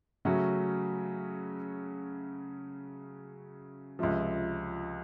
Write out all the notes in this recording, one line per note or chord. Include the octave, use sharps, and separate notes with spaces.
C#3 F#3 A3 C#4 F#4
C#2 C3 F3